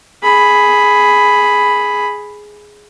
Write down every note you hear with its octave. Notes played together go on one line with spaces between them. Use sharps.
G#4 B5